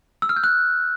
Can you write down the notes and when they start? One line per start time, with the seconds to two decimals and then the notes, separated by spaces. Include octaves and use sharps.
0.22 E6
0.29 F6
0.36 G6
0.44 F#6